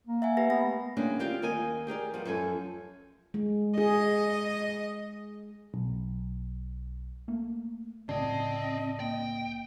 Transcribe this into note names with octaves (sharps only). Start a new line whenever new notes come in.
A#3
E5 F#5 G#5
G4 B4 A#6
A#3 B3 A#6
A3
D2 G3 A#3 C#4 D4 G#4
C4 F4 G4 D5
D#2 A#4 D#5 G#5
G4 G#4 A#4 D5
F3 G3 B3
F#2 F3 A4 G#5
G#3
G#4 D#5
B1
A3 A#3
C2 A2 C#3 C4 D5 D#5 A5
A#3 G5